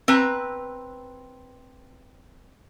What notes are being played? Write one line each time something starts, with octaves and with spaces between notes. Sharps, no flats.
C4 B4 A#5